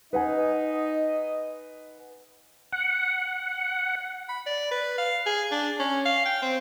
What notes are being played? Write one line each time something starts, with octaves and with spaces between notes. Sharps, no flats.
D#4 B4 D#5 F#5 G#5
F#5
B5
D5
B4
F5
G#4
D4
C#4
F5
G5
C4